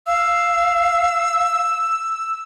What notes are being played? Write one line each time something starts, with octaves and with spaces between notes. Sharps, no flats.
F5 E6